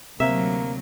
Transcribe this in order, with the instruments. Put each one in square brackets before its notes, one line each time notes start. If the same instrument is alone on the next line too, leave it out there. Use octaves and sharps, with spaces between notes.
[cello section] D2 F#3 [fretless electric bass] C3 C4 [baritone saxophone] A#3 [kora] E5